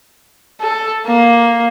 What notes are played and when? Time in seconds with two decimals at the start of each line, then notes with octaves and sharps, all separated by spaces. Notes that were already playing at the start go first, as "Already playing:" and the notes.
0.61 A4
1.06 A#3